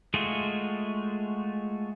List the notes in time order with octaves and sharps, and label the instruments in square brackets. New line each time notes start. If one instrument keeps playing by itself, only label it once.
[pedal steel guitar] G#3 A3 F4 F#4 G#4